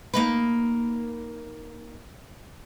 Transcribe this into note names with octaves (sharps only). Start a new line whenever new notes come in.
A#3 D#4 B4